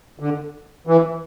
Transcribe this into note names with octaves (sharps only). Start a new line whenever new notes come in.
D3
E3